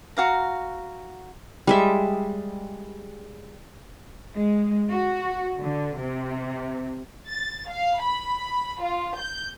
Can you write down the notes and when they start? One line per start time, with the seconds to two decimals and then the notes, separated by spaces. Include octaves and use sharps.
0.17 F#4 F5 A#5
1.67 G3 G#3 E5
4.35 G#3
4.90 F#4
5.61 D3
5.98 C3
7.28 A6
7.69 F5
8.02 B5
8.82 F4
9.17 G6